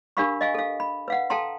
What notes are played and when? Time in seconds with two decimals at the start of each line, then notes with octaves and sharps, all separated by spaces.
0.17 D4 G4 A#4 F5 B5 C#6
0.41 D#5 F5 G#5
0.55 A4 F5
0.80 B5
1.08 B4 F5 F#5
1.30 A4 F5 G5 A5 A#5 C6